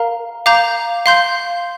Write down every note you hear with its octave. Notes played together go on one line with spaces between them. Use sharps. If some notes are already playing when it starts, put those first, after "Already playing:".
Already playing: A#4 F5 A#5
F5 A#5 D6 G6
F5 C6 G6